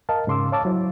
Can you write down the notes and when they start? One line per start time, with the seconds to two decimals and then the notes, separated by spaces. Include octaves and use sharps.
0.09 A#4 D#5 F5 A5
0.27 G#2 C#3 C6 D6 E6
0.52 C#5 F5 A5 D6 E6 A6
0.65 F#3 E4 C5